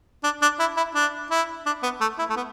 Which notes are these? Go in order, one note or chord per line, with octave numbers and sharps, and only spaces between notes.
D4
D4
E4
E4
D4
E4
D4
B3
A3
E4
A3
B3